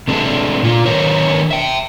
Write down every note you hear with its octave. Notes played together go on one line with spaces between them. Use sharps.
C3 G#3 A3 D4
A#2 F4
D#3 D4 A#4 C5 C#5
E5 G5